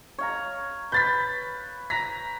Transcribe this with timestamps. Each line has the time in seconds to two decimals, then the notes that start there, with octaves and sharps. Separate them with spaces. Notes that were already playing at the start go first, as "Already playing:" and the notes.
0.19 C#5 F5 A#5
0.92 B4 G6 A6 B6
1.90 A#5 A#6 B6